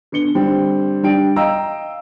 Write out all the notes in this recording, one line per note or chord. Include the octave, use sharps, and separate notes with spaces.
D3 B3 C#7 G7
D3 G3 C4
G3 D4 G5 D7
D#5 F5 G5 A#5 E6